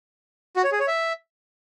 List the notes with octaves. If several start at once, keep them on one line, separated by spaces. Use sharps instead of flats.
F#4
C#5
G#4
C#5
E5